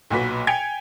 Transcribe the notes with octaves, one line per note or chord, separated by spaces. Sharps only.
B1 A#2 F#4 B4 B6
G5 G#5 G#6 C#7 D7 F7